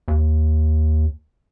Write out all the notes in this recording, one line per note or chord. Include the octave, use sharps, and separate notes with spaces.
D#2